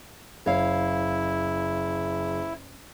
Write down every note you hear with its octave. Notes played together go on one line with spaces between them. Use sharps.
F#1 E4 C#5 F5